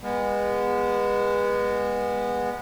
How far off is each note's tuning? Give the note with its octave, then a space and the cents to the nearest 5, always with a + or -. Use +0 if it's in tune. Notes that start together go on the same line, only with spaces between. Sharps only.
G#3 -30 B3 -20